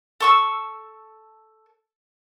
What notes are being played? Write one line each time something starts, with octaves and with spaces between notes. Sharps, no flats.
A4 C#6 E6